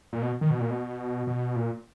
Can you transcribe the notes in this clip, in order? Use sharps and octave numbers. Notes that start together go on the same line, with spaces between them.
A#2
B2
D#3
B2
A#2
B2
B2
A#2